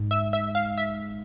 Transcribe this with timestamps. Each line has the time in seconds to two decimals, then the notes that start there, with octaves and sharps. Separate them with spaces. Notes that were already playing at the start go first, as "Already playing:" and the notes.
Already playing: G#2
0.11 E5
0.33 E5
0.55 F5
0.78 E5